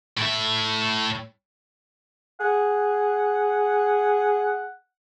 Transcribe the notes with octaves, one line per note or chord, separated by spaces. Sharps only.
A2 E5
G#4 F#5